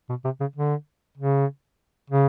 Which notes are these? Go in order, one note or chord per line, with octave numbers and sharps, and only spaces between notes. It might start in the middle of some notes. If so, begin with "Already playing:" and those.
B2
C3
C#3
D3
C#3
C#3